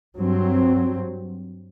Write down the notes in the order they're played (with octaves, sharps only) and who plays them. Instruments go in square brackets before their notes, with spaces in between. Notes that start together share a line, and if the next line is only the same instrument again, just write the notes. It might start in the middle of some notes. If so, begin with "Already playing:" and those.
[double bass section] G2 F#3 C4